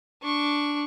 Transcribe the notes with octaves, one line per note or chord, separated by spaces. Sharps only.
D4 C#6